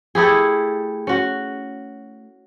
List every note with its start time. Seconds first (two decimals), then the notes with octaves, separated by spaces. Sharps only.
0.15 A3 E4 G4 G#4
1.07 C#4 F#4